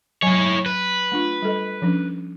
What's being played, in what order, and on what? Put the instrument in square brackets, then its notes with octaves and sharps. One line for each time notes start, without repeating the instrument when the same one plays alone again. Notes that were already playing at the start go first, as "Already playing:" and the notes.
[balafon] F#3 G#5 [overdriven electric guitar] E4 C#5
[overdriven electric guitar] B4
[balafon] A3 D4 F4
G3 A4 D#5
F3 C#4 D4